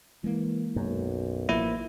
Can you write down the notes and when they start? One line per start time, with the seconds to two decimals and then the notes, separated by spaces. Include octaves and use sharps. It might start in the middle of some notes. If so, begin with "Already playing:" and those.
0.24 E3 G#3 A#3
0.76 B1 F#2
1.49 A1 F3 A#3 E4